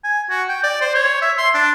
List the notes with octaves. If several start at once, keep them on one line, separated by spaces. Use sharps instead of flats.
G#5
F#4
G5
D5
C5
C#5
E5
C6
D4